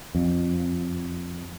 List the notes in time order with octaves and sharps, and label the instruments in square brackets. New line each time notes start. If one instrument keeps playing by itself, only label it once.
[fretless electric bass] F2